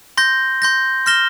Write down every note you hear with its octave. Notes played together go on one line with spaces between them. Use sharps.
C6 G6 A#6
C6 G6 A#6
C6 F6 A#6 E7 G7